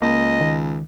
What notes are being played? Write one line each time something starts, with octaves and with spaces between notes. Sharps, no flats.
C#2 A#3 D#5
D#3